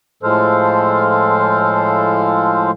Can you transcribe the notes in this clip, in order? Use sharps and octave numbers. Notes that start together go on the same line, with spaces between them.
A2 F3 G#3 A4 C5 F5